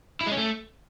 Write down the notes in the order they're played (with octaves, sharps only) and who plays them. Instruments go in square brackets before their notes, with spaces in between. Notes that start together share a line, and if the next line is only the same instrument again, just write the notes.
[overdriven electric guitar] E4
G#3
C#4
A3